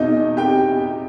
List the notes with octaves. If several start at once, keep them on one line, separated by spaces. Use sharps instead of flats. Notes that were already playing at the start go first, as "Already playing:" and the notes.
Already playing: E2 B2 D#4 D#5
G4 G5